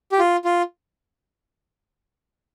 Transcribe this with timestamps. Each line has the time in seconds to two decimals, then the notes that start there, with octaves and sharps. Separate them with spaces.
0.12 G4
0.19 F4
0.45 F4